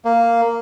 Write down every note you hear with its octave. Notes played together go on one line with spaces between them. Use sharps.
A#3